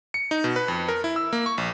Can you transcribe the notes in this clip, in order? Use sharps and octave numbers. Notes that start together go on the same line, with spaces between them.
C#7
D#4
B2
B4
F2
A#4
E4
E6
A#3
C#6
A#1